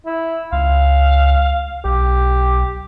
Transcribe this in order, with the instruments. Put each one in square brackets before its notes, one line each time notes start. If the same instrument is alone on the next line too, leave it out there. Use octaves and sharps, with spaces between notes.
[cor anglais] E4
[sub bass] C#2 [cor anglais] F5
[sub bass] B1 [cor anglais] G4